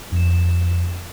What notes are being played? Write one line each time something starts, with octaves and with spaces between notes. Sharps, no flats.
F2 E7